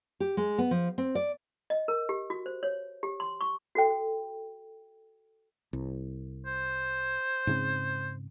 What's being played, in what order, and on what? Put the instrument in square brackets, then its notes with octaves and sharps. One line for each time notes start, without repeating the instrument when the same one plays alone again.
[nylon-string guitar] G4
G#3
B3
F3
C4
D5
[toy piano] D#5
A#4
G4
F#4
C5
C#5
G4
C6
C#6
F#4 A4 G5
[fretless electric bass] C2
[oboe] C5
[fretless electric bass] G#2 C#3 C4